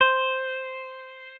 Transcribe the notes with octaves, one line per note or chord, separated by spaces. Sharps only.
C5